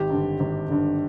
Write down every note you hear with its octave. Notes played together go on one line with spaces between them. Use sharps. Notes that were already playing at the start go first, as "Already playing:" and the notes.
Already playing: G#1 G4
G2 D3
G#1
G2 D3